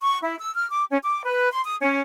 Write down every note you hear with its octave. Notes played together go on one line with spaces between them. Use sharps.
C#6
E4
E6
F6
D6
C#4
D6
B4
C6
D#6
C#4